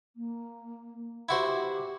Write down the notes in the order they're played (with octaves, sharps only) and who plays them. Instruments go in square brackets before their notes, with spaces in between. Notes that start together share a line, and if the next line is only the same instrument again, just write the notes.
[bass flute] A#3
[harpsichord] E4 F#4 C5 [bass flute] G4